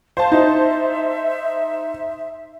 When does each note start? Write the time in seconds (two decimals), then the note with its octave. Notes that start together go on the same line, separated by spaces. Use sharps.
0.17 C5 F5 A5
0.32 D#4 E5